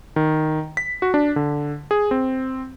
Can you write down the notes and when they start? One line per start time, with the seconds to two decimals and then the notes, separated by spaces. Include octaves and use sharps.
0.16 D#3
0.77 B6
1.02 F#4
1.14 D4
1.36 D3
1.91 G#4
2.11 C4